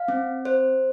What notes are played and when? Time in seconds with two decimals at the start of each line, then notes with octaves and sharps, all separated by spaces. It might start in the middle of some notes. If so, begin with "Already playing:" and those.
Already playing: F5
0.08 C4
0.45 C5